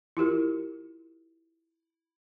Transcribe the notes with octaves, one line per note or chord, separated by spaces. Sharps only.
E4 F4 G4 A#4